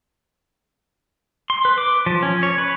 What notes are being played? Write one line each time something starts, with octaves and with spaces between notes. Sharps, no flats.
C6
B4
D6
F3
C#4
C#5
B4